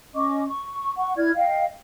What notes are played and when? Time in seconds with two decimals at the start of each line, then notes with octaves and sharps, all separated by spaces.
0.15 C#4 D#5 C#6 D6
0.45 C#6
0.97 F#5 C#6
1.17 E4 D5 F6 G#6
1.36 D#5 F5 G5